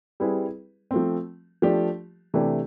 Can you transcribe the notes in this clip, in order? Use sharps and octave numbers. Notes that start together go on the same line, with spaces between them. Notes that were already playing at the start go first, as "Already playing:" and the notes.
G3 C4 E4 G#4 B4
F3 A3 C4
F3 A3 D4 G4
C3 E3 A3 D4 G4